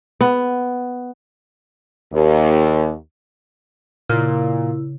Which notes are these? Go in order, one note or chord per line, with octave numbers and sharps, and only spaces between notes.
B3
D#2
A#2 C#3 E4